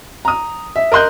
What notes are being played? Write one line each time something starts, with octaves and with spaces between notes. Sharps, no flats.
A#5 D#6
E5
A#4 D#5 C6 F#6 G6